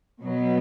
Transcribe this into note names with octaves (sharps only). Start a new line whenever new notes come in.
B2 F#3 B3